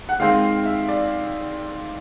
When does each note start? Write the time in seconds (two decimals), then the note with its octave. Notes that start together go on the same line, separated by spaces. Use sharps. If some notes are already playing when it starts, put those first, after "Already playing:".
0.09 F#5
0.20 D#3 G#3 C4 F5
0.65 E5
0.88 D5